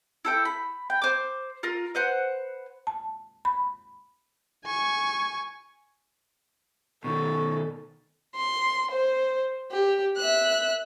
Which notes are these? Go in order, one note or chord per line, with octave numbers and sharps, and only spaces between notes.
E4 A4 G5
B5
G5
C5 D6
F4 A#4
B4 C5 F#5
A5
B5
G#5 C#6
B2 D#3 A4 C#6
C6
C5
G4
E5 F#6